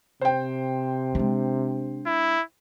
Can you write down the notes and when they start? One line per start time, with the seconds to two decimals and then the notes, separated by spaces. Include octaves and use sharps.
0.21 C3 C5 G5
1.15 G#3 D4
2.06 E4